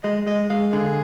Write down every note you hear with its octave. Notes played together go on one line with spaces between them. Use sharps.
G#3 D#5
G#3 D#5
G#3 F5
D3 G#4